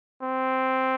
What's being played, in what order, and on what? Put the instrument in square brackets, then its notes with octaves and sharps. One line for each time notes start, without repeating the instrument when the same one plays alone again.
[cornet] C4